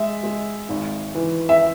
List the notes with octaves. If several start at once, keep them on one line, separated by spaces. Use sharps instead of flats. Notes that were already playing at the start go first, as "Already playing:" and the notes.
Already playing: G#3 E5
G#3
G#1
E3
E5